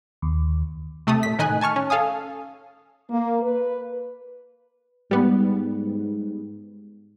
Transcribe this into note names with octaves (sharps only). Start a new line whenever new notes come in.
D#2
C3 A3 A5 D#6
A#2 B6
A2 D#3 D#5 G#5 F#6
G#5 A5 C#6 F6
C#4
A4 F5 G#5 D#6
A#3
B4
G#2 G3 B3